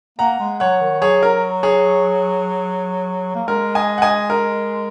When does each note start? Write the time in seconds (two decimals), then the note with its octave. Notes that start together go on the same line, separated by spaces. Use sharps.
0.19 A#3 F#5 A#5
0.40 G#3
0.60 F#3 C#5 F#5
0.81 D#3
1.01 F#3 G#4 C#5
1.23 A#4
1.63 G#4 C#5
3.35 A#3
3.48 G#3 A#4
3.75 D#5 G#5
3.98 F#5
4.02 D#5 G#5
4.30 A#4